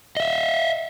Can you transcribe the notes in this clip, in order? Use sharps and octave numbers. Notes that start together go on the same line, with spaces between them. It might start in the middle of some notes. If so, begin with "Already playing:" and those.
D#5 E5